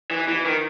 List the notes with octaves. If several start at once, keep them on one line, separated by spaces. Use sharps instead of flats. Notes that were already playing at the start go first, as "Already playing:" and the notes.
E3
E3
D#3